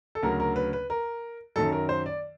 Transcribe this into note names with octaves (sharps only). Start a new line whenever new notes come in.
A4
D2 C#3 F#3 A#4
A#4
B4
B4
A#4
F#2 D#3 F#3 A4
A#4
C5
D5